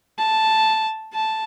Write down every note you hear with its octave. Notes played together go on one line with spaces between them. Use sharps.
A5
A5